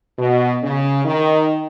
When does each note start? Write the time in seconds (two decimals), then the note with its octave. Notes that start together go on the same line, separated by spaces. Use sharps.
0.17 B2
0.63 C#3
1.04 D#3